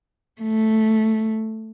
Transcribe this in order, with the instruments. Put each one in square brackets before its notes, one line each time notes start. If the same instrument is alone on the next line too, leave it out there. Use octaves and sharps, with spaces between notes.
[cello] A3